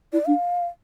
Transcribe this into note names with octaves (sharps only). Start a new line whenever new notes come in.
E4 D5
D4 F5